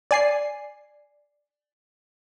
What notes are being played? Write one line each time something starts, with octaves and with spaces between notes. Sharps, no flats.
D5 G#5 C7